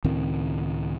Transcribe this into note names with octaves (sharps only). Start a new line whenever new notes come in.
C#2 A2 D#3 C4